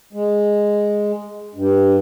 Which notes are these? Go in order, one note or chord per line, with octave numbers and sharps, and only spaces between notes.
G#3
G2